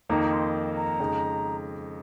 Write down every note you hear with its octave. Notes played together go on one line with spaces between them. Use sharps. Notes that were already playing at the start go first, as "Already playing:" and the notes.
F2 D#3 A#3 D#4 A#5
C6
A#5
F2 C#3 G#3 D#4